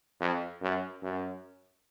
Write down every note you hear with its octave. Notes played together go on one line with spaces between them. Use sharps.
F2
F#2
F#2